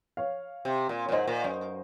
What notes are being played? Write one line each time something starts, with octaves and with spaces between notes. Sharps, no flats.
C#5 F5
C3
A#2
C#5
A#2
G#2 C5 D#5
A#2
F#2